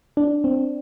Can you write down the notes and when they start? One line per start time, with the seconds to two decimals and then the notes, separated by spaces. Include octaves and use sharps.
0.17 D4
0.44 C4